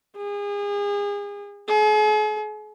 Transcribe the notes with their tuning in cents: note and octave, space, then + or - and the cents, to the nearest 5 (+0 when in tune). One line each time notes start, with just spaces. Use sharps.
G#4 -35
G#4 +40